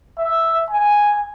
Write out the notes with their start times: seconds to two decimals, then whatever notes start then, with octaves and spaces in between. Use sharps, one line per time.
0.18 E5
0.70 G#5